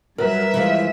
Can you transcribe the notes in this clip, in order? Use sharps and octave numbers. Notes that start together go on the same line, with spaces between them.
G2 F#3 A#4 B4 E5
E3 F3 G#3